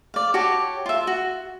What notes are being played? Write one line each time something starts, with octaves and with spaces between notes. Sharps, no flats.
D5 F5
F#4 G4 C#5 A5
F4 E5
F#4